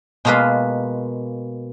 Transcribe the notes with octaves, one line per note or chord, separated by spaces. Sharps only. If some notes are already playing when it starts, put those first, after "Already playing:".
B2 G#3 A#3 F4 B4 F5